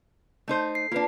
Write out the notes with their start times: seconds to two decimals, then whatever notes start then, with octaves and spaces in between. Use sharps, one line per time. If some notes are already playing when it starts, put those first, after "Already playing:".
0.48 A3 D#4 C5
0.75 C7
0.92 A#3 D4 F4 B4